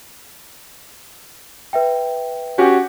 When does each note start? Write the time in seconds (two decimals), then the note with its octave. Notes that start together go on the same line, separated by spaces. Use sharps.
1.73 B4 E5 G5
2.58 C#4 F#4 G4